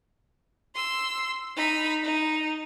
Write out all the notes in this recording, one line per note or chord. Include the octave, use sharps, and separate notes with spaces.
C6 E6
D#4 B5
D#4